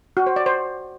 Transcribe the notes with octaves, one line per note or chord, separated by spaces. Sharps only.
F#4
C5
D5
C5